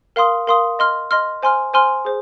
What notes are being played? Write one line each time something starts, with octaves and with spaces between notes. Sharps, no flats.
A#4 F5 C6 D#6
A#4 F5 C6 D#6
D#5 C6 F6
D#5 C6 F6
C5 G#5 C6 F6
C5 G#5 C6 F6
G#4 C5